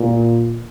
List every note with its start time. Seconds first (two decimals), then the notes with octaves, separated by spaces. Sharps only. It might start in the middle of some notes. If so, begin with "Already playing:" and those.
Already playing: A#2